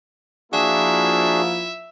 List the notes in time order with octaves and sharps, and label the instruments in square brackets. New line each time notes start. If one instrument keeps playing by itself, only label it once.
[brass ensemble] F3 A#3 E4 [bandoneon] D4 F#4 G#4 [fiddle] E5